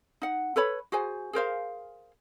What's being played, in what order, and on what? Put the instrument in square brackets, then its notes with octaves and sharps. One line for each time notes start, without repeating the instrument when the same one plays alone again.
[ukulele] D#4 F#5
A4 B4 C#5 B5
F#4 G#4 C5 G#5
G#4 A#4 C5 F5